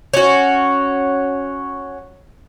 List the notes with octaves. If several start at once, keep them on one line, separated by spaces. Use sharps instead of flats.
C#4 F#4